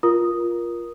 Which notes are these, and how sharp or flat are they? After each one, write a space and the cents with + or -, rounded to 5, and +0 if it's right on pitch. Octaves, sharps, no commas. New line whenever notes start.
F4 +0 A#4 +20 D#6 -5